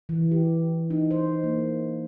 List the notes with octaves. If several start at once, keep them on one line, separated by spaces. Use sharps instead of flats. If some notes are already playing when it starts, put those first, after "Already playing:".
E3
G4
D#4
C5
A#3